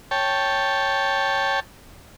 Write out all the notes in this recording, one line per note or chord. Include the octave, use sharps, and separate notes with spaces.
C#5 G5 A5